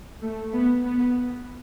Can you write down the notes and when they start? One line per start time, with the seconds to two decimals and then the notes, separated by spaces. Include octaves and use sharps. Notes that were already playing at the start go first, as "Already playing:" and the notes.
0.22 A3
0.53 B3
0.84 B3